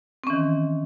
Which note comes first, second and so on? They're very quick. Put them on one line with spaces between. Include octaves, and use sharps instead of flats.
C4 C#4 E3 D#3